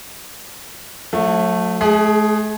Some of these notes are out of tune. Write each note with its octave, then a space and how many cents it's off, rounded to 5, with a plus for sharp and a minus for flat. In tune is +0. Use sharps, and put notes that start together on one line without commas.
F#3 -45 A3 +0
A3 -45 G#4 +0